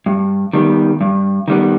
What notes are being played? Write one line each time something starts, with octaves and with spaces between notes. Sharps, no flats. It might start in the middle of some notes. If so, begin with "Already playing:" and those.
G2
D#3 G3 B3
G2
D#3 G3 B3